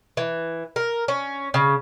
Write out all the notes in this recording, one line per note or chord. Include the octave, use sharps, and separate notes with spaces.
E3
A#4
C#4
C#3